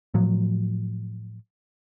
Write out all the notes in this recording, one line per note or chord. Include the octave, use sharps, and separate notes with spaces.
A2 F3 F#3